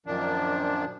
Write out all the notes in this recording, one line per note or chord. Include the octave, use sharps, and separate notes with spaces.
F#2 A#2 D#3 F3 D4